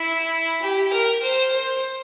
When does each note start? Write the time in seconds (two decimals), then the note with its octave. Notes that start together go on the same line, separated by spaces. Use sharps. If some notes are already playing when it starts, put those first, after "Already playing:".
Already playing: E4
0.62 G4
0.92 A#4
1.22 C5
1.52 C5